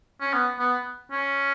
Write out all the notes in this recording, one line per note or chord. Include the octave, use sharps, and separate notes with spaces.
C#4
B3
B3
C#4